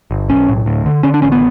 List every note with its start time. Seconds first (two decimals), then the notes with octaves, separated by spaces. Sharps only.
0.11 G1
0.29 B1 C#4
0.48 A2
0.66 D2
0.86 D3
1.03 D3 C#4
1.14 D4
1.22 A1 C#4
1.32 B3